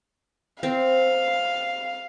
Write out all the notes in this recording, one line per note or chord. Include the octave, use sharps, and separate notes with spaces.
C4 F5